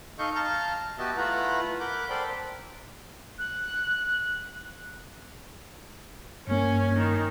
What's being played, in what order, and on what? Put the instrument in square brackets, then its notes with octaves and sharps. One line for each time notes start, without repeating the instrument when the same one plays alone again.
[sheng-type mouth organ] D#4 A4 D#5 F5 C#6 G6
F5 A5 A#5 F6 G6
B3 F#4 G4 D#5 E5 A5
A3 E4 F4 B4 F#5 A#5
A#4 F#5 B5 D6 G6
A4 A#4 C5 D5 G5 B5
[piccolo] F#6
[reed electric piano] G2 A#3 [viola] C#4 G#5
[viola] D#3